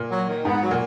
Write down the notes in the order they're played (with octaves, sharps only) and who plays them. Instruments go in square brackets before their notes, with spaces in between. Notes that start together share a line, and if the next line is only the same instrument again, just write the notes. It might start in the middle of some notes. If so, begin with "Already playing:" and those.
Already playing: [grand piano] A#2
[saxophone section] F#3
D#3
[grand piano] G#2 [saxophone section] B3
[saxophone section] F#3
[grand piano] A#2